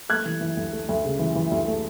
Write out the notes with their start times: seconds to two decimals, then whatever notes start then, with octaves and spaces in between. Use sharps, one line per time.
0.09 A3 F#6 G#6
0.25 E3
0.41 E3
0.57 D2
0.73 A3
0.89 D2
1.05 C#3
1.19 E3
1.35 E3
1.51 D2
1.67 A3